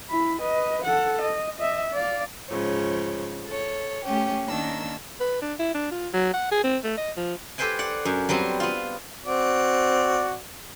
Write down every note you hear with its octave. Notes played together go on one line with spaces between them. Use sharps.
E4 B5
B4 D#5
A4 F#5
D#5
D#5 E5
D5 F5
G#2 C#3 F3 C#5
A4 C#5
A3 C#4 G4
D#3 A#3 C#4 D4 E6
B4
D4
E4
D4
F4
F#3
F#5
G#4
C4
A3
D#5
F3
G4 A4 B4 C5 G5 G#5
D5 F#5
F#2
F#3 G3 B3 C4
B3 F4
C4 F#4 D5